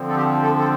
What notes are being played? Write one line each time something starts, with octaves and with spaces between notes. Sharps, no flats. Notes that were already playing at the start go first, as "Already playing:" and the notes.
Already playing: D3 F3 C4
A4
G4
A4
A4